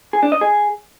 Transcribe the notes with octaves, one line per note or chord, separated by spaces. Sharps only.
G#4
D4
D#5
G#4